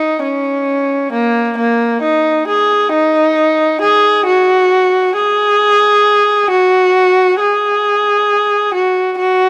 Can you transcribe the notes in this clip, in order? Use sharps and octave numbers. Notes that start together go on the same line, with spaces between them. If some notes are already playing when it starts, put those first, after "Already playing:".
Already playing: D#4
C#4
A#3
A#3
D#4
G#4
D#4
G#4
F#4
G#4
F#4
G#4
F#4
F#4